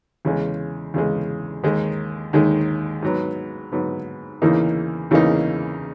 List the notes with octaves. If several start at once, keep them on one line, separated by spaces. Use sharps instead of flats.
E2 C#3 G#3
E2 C#3 G#3
D#2 D#3 G#3
D#2 D#3 G#3
G#2 F#3 B3
G#2 F#3 B3
E2 C#3 E3 A#3 D#4
E2 C#3 E3 A#3 D#4